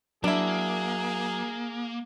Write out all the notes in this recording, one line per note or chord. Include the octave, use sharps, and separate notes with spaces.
F#3 A#3 D4 E4 G#4